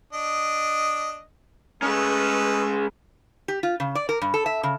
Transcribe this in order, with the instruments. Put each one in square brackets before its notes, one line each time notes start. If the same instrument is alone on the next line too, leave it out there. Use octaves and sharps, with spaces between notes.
[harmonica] D4 D#5
[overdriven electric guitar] G#3 C#4 [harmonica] A3 B4 D#5
[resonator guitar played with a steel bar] G4
F4
C#3
D5
A#4
G2
A4
E5
C#3